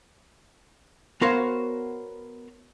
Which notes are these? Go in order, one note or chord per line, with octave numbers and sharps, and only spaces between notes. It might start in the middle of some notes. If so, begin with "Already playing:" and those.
B3 F#4 A#4 C5 C#5 F5